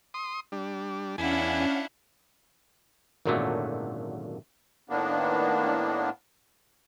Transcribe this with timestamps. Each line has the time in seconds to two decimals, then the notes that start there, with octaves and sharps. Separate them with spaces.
0.14 C6 D#6
0.52 G3 D4
1.18 E2 C#4 D4 E4 F5 F#5 G#5
3.26 G#1 F#2 A#2 D3 F#3 A3
4.90 A2 D#3 A#3 B3 D4